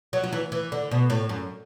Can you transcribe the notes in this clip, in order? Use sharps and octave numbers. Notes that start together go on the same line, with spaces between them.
F#3
F#3
E3
E3
D3
B2
A2
F#2